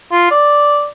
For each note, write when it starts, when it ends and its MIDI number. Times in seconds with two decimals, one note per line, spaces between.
0.11 0.30 65
0.31 0.87 74